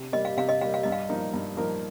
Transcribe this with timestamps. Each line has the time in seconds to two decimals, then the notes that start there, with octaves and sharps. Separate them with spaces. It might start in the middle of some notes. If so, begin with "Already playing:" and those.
Already playing: C3
0.13 G3 A#3 D#5
0.25 F5
0.37 C3 F5
0.49 D#5
0.61 G3 A#3 F5
0.74 F5
0.83 G2 D#5
0.92 F5
1.09 F3 A#3 D#4 A#4
1.34 G2
1.57 F3 A#3 D#4 A#4